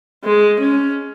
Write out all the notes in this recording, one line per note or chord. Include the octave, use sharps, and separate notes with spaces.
G#3
C#4